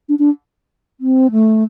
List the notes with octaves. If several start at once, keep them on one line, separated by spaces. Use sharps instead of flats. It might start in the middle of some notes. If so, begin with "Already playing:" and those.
D4
D4
C4
A3